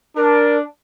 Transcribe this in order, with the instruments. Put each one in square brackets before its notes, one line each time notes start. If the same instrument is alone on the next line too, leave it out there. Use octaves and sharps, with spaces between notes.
[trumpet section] D4 [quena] A#4